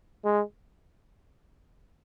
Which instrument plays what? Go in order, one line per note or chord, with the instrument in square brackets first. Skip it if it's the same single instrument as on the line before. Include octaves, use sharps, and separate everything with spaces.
[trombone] G#3